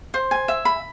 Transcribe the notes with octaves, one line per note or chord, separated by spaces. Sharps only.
C5
G#5
E5
B5